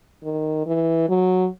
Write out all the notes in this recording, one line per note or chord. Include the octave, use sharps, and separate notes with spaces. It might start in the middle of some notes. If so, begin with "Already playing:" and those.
D#3
E3
F#3